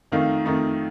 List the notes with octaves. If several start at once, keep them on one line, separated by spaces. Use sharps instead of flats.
F2 D#3 A3 D#4 F5
F2 D#3 A3 D#4